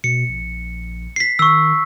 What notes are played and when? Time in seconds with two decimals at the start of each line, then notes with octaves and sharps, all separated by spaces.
0.04 B2 C#7
0.29 A#1
1.16 B6 C7
1.39 D#3 C#6 E6